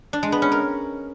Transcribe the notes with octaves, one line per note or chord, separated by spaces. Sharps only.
D4
G#3
B3
C#4
A#4